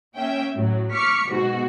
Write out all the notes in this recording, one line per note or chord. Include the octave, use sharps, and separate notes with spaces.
A#3 C#4 E5 G5
A2 F#3
C#6 D6 F6 B6 C#7
G#2 B2 F#4